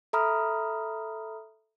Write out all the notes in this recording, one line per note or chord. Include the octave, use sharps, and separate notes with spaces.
A4 E5 A#5 B5 D#6 F6